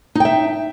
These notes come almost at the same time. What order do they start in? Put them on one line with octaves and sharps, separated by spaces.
D#4 G5 E5